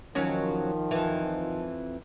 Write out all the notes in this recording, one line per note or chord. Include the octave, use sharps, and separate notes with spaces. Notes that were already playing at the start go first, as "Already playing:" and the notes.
D#3 F3 F#3 C#4
F2 E3